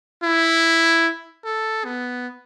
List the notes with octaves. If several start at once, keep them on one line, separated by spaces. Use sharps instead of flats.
E4
A4
B3